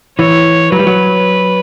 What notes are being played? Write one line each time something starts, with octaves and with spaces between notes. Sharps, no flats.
E3 C#5
F#3 B4
G3
F#3